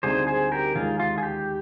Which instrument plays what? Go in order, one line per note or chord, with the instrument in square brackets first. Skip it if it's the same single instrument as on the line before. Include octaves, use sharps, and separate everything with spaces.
[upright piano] D2 D3 G3 C4 D#4 [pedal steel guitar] G#4 C5
[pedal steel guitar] G#4 C5
G4 A#4
[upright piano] D#2 D#3 G#3 D#4 [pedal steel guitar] F4 G#4
[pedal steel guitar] F4
G#4
G4